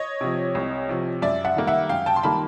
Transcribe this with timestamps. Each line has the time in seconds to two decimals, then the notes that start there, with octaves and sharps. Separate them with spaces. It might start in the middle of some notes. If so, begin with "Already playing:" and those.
Already playing: C#5 D#5
0.21 C3 F3
0.55 C2
0.89 C3 F3
1.22 F#2 D5 E5
1.45 E5 F#5
1.56 D#3 G3 A#3
1.67 E5 F#5
1.89 F#2 F5 G5
2.06 G5 A5
2.16 C6
2.23 D#3 G3 A#3 A5 B5